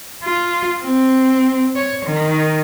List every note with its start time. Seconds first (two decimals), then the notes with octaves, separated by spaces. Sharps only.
0.23 F4
0.83 C4
1.76 C#5
2.05 D#3